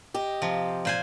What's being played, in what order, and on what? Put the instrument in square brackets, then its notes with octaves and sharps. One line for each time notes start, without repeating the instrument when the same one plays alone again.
[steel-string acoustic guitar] G4 D#5
[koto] C3 F3
A#2 C5 G#5